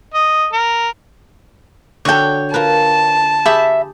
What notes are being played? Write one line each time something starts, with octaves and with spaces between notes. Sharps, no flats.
D#5
A#4
D3 F#4 A4 C#5 G5
F4 A#4 B4 A5
G4 G#4 E5 B5